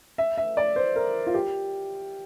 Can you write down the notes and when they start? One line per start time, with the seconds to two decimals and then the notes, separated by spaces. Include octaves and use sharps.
0.18 E5
0.38 E5
0.57 D5
0.76 C5
0.96 A#4
1.27 F4
1.34 G4